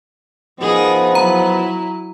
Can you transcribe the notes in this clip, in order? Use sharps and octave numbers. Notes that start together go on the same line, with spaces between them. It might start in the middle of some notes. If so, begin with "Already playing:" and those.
F3 B3 D#4 G#4 A#4
F#3 E4 A#5